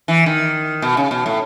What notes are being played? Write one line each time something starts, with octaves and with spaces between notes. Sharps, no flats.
E3
D#3
B2
C#3
B2
A2